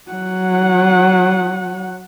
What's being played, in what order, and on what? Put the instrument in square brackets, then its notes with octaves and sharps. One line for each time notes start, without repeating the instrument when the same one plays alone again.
[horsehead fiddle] F#3 F#5